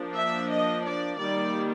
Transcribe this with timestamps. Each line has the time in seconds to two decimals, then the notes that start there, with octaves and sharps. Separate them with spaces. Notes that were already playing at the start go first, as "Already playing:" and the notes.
Already playing: F3 A#3 D4
0.15 E5
0.50 D#5
0.85 D5
1.19 D#3 G3 A#3 D5